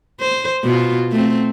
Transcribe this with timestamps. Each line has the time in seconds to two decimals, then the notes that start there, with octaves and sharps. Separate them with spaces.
0.20 C5
0.64 B2 F4
1.11 A3 C4